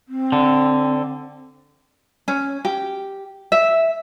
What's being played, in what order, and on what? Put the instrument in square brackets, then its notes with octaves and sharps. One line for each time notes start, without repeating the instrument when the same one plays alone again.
[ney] C4
[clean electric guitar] D3
[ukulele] C#4
G4
E5